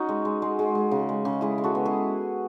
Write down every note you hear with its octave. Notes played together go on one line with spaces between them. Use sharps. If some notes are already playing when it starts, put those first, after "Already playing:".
Already playing: C#4 D#4 F#4
G#3
G#3
G#3
G#3
G#3
C#3
G#3
C#3
G#3 E4 G#4
G#3
F#4 A4
B3
E4 G#4